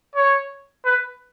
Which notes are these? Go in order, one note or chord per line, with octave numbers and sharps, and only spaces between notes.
C#5
B4